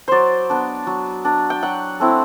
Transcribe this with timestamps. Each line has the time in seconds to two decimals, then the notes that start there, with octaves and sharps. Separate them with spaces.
0.08 F#3 C5 D5
0.50 B3 D4
0.87 F#3
1.25 B3 D4
1.50 G5
1.63 F#3 F#5
2.00 A3 C4 E4